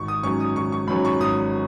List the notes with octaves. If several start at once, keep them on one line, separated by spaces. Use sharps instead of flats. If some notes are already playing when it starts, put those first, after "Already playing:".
Already playing: G#1 C#6
D#6
G#2 F#3 C#4 C#6
D#6
G#1 C#6
C#6
G#2 F#3 C#4 B5
C#6
G#1 D#6